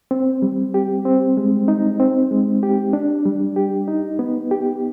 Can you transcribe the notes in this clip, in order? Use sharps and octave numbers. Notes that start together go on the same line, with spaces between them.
C4
G3
G4
C4
G#3
D#4
C4
G#3
G4
D4
G3
G4
D#4
B3
G4